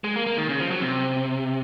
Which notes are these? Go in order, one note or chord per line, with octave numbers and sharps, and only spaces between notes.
G#3
A#3
A#3
D#3
C#3
F3
F#3
C3